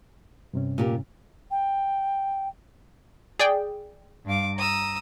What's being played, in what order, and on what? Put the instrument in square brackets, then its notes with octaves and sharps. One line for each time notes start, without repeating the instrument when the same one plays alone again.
[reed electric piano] G2 C3 C#4
[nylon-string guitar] A#2 G4 A#4
[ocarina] G5
[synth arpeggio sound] G#4 D5 G5
[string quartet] G2 F5 D6
A#5 D#6 E6